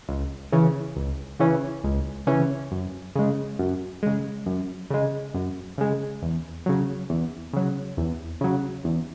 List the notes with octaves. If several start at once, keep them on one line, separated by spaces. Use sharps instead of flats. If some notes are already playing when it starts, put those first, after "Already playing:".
C#2
C#3 E3 C#4
C#2
C#3 E3 C#4
C#2
C#3 E3 C#4
F#2
C#3 G#3
F#2
C#3 G#3
F#2
C#3 G#3
F#2
C#3 G#3
E2
C#3 F#3
E2
C#3 F#3
E2
C#3 F#3
E2